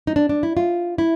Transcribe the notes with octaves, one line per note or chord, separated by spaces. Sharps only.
D#4
D4
D4
E4
F4
E4